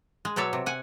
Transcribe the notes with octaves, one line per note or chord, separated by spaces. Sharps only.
G#3
B2 F#3 C#5 D5 E5
C3
F#5 G#5